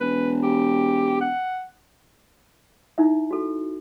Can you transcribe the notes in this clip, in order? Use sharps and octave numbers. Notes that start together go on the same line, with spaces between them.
E1 B4
G4
F#5
D#4 E4 E5
F#4 A4